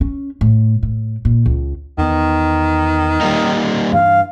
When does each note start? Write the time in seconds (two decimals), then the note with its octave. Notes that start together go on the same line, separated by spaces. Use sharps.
0.01 C#4
0.41 A2
0.83 A2
1.25 A#2
1.46 C#2
1.98 E2 D#3 B3
3.21 G3 A#3 D#4
3.93 G2 E3 F5